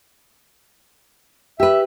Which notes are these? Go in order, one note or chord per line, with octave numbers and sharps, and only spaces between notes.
G4 B4 E5